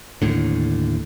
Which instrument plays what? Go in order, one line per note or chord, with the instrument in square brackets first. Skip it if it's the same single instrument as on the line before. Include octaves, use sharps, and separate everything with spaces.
[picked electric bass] D#2 A2 D3